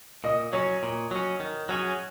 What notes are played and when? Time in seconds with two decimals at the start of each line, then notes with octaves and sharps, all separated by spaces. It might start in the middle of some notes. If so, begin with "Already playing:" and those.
0.24 A#2 D#5
0.53 F#3 C#4 C#5
0.83 A#2
1.11 F#3 C#4
1.40 D#3
1.69 F#3 C#4 G#4